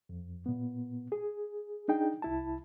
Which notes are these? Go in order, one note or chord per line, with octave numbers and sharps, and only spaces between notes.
F2
A#2 B3
G#4
D4 D#4 G#4 G5
C2 E4 A5